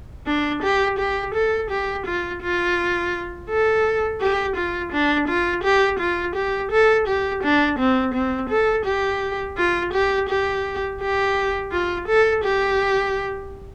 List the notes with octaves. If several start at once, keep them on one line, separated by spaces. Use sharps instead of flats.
D4
G4
G4
A4
G4
F4
F4
A4
G4
F4
D4
F4
G4
F4
G4
A4
G4
D4
C4
C4
A4
G4
F4
G4
G4
G4
F4
A4
G4